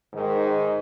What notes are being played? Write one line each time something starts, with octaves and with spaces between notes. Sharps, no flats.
G#2 D#3 G#3